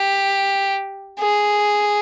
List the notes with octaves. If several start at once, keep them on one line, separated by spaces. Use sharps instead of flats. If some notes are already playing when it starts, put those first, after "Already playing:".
Already playing: G4
G#4